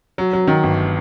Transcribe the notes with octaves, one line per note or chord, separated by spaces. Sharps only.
F#3
F#3
D#3
G1